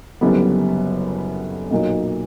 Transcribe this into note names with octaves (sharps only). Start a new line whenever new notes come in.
F#1 F#2 D3 G3 B3
B1 A#2 F#3 A#3 D#4